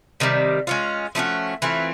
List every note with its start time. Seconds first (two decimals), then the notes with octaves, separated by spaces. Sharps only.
0.20 C3 D#3 G3
0.67 G#3 C#4 F4
1.15 F3 A3 C#4 F#4
1.62 E3 A3 C4 F4